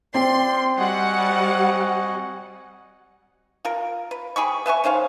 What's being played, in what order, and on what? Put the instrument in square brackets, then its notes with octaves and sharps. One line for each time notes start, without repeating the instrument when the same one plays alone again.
[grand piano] C4 G5 [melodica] F4 D5 [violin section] C6
[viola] G3 [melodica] F#4 D#5 G#5 [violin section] F#5
[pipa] F4 A#4
B4
G4 G#4 B5 C#6
B4 E5 G#5 C#6
D#3 C#4 C5 F5